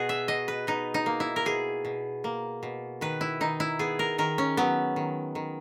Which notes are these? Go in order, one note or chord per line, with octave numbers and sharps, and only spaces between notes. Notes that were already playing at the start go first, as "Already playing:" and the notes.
Already playing: B2 F#4 G#4
E5
B2 D#5
B4
B2 D#4
D#4
A#3
E4
A#4
B2 G#4
B2
A#3
B2
D#3 B4
E4
D#3 D#4
E4
B3 G#4
A#4
D#3 A#4
C#4
F#3 B3
D#3
D#3